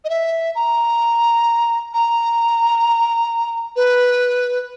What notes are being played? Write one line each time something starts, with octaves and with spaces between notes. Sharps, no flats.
D#5
E5
A#5
A#5
B4